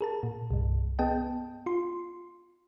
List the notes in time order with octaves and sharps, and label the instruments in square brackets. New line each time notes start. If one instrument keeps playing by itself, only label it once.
[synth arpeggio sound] G#4 A#4 A5
A#2
C2 G2
B3 G#4 D#5 G5 A5
F4 C6